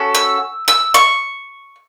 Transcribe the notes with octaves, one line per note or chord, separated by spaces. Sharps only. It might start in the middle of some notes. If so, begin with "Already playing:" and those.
Already playing: C#4 F#4 A4
E6
E6
C#6